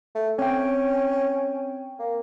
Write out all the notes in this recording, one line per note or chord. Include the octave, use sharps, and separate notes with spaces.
A3
C4 C#4 G5
A#3